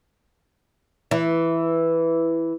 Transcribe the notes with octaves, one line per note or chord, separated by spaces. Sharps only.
E3